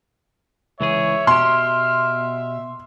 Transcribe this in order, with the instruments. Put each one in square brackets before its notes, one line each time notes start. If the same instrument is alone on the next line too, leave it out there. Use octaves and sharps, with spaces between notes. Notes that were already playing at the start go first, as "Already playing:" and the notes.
[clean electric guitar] C#2 E3 G#4 [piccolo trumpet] C#5 [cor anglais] E5
[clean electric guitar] B2 G4 [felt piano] C6 [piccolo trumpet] F6